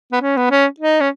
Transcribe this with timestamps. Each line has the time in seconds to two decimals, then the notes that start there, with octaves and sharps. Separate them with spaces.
0.12 B3
0.22 C#4
0.37 B3
0.51 C#4
0.80 D#4
1.00 C#4